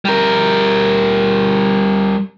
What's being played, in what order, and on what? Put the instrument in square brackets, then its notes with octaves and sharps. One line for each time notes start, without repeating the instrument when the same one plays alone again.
[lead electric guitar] G3 A#4